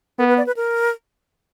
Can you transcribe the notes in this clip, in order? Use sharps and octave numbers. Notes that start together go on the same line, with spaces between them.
B3 A#4
B4
D5
B4
A#4